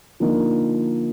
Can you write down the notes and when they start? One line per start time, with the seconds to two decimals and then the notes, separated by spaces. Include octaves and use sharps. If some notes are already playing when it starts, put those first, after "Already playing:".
0.20 D3 F3 A#3 D#4 A#4